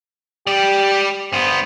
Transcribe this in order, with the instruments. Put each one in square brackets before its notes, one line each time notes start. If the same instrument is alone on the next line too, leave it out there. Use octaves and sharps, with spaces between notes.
[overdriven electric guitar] G3 D5 [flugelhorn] G4
[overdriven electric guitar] G2 B3 [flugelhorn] C5